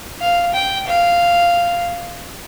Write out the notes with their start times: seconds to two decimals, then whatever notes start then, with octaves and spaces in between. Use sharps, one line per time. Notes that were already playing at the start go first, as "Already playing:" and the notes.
0.21 F5
0.54 G5
0.87 F5